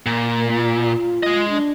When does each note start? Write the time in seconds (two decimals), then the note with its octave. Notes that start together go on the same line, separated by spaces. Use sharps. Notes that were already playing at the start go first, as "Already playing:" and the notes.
0.06 A#2
0.36 A#3
0.53 F4
1.23 G#3 D#5
1.49 D4